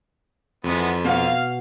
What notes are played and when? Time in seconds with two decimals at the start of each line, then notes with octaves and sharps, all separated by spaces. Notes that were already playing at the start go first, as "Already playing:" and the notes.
0.64 F2 E3 G#3 B3
1.05 B2 F5